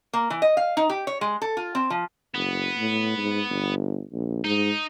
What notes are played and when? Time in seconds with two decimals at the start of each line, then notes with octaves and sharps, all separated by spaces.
0.13 A#3
0.30 E3
0.42 D#5
0.57 F5
0.77 D#4
0.90 G4
1.07 C#5
1.21 G#3
1.42 A4
1.57 F4
1.75 C4
1.90 F3
2.34 F#1 B3
2.76 A2
3.17 G#2
3.50 G1
4.13 A#1
4.44 G#2 D#4